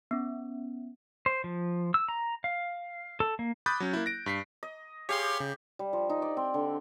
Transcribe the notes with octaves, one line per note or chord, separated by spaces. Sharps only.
B3 C#4
C5
F3
E6
A#5
F5
A4
A#3
B5 D6 D#6 F#6 G6 A6
F#3 C#4
A#3 E4
A#6 D7
G2 B6 C7
D#5
G4 G#4 C#5 F5 C6
C#3
G3
F3
D#4
D5
C4
D3